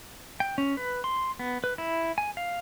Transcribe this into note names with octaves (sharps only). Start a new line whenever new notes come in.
G5
C#4
B4
C6
B3
B4
E4
G#5
F5